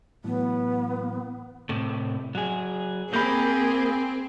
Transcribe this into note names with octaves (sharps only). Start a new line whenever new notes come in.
A2 E3 F#3 B3
A2 C3
F#3 G#4
A#3 C4 G#4 B5 G6